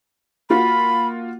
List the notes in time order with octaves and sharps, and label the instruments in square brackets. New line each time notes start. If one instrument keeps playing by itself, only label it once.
[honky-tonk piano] A#3 F4 F#4 [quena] B5